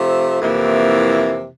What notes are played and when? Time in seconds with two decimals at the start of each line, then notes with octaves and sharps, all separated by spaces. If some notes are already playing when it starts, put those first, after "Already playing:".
Already playing: C3 F3 A3
0.42 F2 C3 E3 A#3 E4